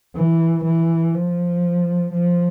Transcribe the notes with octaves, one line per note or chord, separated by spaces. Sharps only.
E3
E3
F3
F3